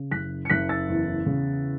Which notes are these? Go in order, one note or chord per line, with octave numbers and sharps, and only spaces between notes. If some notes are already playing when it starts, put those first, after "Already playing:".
Already playing: C#3
F#1 F#6 B6
C#7
F#1 F#6 B6
E6 A6
E2
C#3